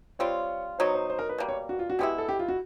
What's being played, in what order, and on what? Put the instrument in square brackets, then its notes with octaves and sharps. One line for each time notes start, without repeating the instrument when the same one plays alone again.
[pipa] G3 C4 F4 [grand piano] C#5
[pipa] F#3 B3 D#4 [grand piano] C5
[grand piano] C5
C5
A#4
B4
[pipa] B2 G3 A#3
[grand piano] C#5
F#4
F4
F#4
[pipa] B2 G#3 B3 E4 [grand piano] G4
[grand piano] A4
G4
F4
F#4